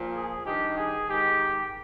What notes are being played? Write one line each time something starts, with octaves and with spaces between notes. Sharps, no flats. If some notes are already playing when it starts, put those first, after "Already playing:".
Already playing: A#2 F3
G#4
G2 D#3 G4
G#4
G#2 D#3 G4